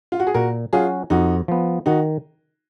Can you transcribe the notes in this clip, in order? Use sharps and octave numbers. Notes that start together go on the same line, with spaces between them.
F4
F#4
G#4
A#2 F#4 A#4
F#3 C#4 F4 F#4 G#4
F2 D#4 F#4
F3 B3
D#3 D#4 F#4